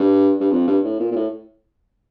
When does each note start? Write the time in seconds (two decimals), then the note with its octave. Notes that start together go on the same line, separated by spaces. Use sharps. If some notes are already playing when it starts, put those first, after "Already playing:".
Already playing: G2
0.40 G2
0.51 F2
0.68 G2
0.84 A2
1.00 A#2
1.12 A#2
1.16 A2